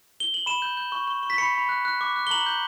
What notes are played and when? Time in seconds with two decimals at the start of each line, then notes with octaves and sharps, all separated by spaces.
0.20 G7
0.34 F#7
0.46 B5 E7
0.62 G6
0.77 G6
0.92 C#6
1.07 C#6
1.23 C#6
1.30 B6
1.38 B5 C#7
1.55 B5
1.69 F#6
1.85 F#6
2.01 D6
2.16 F#6
2.27 G7
2.31 A#5 F#7
2.46 G6